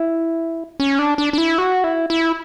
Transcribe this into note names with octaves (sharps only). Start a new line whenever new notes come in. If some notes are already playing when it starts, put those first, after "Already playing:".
Already playing: E4
C#4
D4
D4
D4
E4
F#4
E4
E4